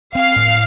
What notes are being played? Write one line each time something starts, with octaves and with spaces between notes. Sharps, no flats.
C4 F5
A2